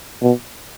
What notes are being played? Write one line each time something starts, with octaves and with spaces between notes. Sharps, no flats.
B2